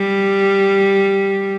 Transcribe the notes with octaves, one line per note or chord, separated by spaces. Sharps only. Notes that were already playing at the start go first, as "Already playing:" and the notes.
Already playing: G3